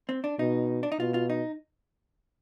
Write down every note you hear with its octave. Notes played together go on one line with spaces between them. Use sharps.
C4
D4
B2 D#4
D4
D#4
B2 F4
F4
D#4